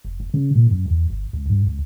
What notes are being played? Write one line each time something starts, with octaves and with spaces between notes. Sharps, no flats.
F1
F1
C#3
A#2
F#2
E2
G1
C#2
G2
C#2